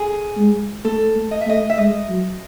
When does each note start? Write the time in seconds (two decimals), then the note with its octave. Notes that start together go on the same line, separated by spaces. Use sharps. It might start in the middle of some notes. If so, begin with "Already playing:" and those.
Already playing: G#4
0.37 G#3
0.84 A3 A4
1.16 A3
1.31 D#5
1.41 E5
1.47 A3 D#5
1.70 E5
1.78 G#3 D#5
2.09 F#3